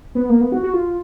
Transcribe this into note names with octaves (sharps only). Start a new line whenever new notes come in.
B3
A#3
B3
F#4
F#4
F4